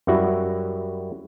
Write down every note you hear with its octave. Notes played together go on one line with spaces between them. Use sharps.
F#2 G3 E4 F#4